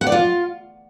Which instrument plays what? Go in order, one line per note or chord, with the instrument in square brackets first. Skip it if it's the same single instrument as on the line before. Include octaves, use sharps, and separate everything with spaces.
[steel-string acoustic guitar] F#5
D5
F4